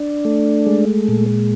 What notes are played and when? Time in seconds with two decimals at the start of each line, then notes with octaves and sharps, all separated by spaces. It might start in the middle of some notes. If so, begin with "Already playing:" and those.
Already playing: D4
0.25 A3
0.67 G#3
1.08 A#2